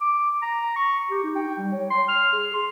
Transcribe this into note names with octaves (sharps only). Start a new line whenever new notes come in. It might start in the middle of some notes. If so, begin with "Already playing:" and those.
D6
A#5
C#6
G4
D#4
G5
G3
C#5
C6
F6
G#4
C6